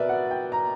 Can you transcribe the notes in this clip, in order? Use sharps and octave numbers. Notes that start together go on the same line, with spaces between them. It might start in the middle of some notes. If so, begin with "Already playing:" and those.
Already playing: B2 A#4 B4 D5 E5
F#5
G5
A#5